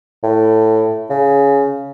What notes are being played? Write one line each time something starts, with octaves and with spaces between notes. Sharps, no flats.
A2
C#3